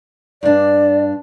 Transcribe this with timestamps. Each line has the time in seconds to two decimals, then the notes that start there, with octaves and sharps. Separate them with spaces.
0.43 G2 D4 D5